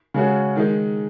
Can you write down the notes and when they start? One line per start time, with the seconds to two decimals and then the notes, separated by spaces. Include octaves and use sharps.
0.14 C#3 G#3 C#4 F#4
0.56 D#3 G#3 D#4